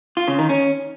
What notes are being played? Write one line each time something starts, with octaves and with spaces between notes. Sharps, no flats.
F4
C#3
D#3
C#4